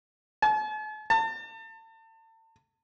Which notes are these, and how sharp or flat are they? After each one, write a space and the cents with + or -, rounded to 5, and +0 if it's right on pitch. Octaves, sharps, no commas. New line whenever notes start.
A5 -45
A5 +35